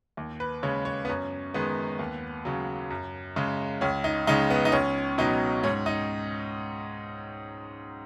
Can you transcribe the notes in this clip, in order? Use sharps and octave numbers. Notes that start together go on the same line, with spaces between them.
D#2
B4
C#3 G#3 C#5
C#5
B3
F#2 C#4
D#3 G#3 B3
D#2
C#3 F#3
F#2
C#3 G#3
C#2 C#4
D#4
C#3 G#3 D#4
B3
D#4
C#2 C#4
B2 F#3 D#4
G#2 C#4
D#4